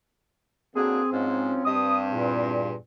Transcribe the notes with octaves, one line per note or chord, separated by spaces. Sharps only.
D3 F#3 A#3 C4 G#4
G#2 F3 F#3 C#4
G2 D#6
E2 A#2